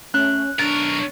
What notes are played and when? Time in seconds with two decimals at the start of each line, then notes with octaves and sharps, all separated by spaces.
0.14 A3 C#4 F#6
0.59 B1 D4 A#4 C#6 A6